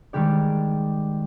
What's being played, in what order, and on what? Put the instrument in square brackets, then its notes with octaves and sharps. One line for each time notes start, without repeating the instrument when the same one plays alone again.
[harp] D#3 G3 G#3 G4 D5